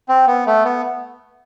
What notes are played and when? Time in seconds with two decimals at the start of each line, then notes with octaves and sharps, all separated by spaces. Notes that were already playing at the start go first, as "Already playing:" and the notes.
0.09 C4
0.27 B3
0.47 A3
0.65 B3